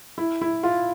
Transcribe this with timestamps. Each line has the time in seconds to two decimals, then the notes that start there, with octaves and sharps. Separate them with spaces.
0.18 E4
0.41 E4
0.63 F4